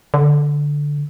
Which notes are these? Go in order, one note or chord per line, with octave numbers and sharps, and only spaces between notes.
D3